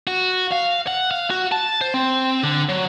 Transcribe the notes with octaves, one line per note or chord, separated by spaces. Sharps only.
F#4
F5
F#5
F5
F#4
A5
C5
C4
D3
F#3